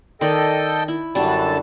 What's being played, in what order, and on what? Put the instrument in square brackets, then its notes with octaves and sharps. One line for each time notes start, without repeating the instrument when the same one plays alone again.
[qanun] D#3 D5 [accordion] A4 D#5 G5
[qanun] E4
[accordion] F#2 D3 A5 [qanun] G3 D4 F#4